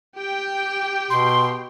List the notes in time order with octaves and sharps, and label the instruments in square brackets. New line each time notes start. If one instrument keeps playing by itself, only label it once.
[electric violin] G4 G5
[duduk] B2 [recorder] C6